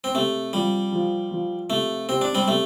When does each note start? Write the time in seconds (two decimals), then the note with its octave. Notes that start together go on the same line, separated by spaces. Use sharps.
0.04 C4
0.15 C3 A3
0.53 F3 G3
0.92 F3
1.31 F3
1.70 C3 A3
2.09 C3 C4
2.21 D4
2.35 G3 C4
2.48 C3 A3